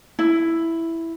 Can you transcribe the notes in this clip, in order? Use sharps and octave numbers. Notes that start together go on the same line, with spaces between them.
E4